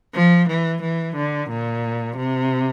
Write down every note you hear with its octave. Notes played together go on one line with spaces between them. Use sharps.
F3
E3
E3
D3
A#2
C3